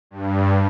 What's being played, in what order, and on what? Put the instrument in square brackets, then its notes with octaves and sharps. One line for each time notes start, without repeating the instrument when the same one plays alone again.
[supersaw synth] G2